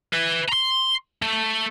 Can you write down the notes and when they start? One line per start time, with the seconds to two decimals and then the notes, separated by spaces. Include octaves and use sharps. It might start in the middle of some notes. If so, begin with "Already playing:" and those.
0.13 B4 E5
0.49 A#5 C6
1.22 A3